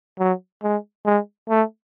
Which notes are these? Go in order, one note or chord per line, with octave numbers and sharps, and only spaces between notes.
F#3
G#3
G#3
A3